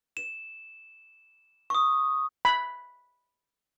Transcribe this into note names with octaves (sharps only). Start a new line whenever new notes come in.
E7
C#6 D#6
B5